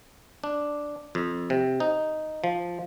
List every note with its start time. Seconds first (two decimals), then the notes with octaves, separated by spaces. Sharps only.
0.44 D4
1.15 F2
1.50 C3
1.80 D#4
2.44 F3